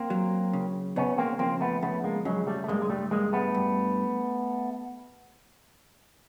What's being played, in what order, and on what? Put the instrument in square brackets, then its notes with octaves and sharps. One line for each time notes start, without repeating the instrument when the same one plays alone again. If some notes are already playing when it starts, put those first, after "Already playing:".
Already playing: [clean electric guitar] A#3 C4
[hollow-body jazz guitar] F#3
C#3
[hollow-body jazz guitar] C#3 [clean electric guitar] B3 C#4
[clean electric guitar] A#3 C4
[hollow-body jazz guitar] F2 [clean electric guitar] A#3 C4
[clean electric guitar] A3 B3
[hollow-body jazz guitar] C#3 [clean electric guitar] A3 B3
[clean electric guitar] G#3 A#3
[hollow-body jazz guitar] C#3 [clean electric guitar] F#3 G#3
[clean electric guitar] G3 A3
A3
[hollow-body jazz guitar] G2 [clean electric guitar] G#3 A#3
[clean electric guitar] G#3
G3 A3
[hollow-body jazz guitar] G2 [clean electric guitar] G#3 A#3
[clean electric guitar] A3 B3
[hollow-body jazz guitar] G2